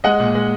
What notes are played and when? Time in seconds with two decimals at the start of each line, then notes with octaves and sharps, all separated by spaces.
0.04 G#3 D#5 F#5
0.20 A#2
0.35 G#3